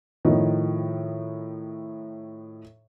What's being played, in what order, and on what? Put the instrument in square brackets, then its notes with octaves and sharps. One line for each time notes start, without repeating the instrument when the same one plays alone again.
[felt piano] A2 D#3 F3